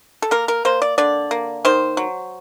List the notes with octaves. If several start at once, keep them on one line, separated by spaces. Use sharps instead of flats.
A4
A#3 A#4
A#4
A#3 C5
D5
D3 D5
A#3
D#3 C5
F#3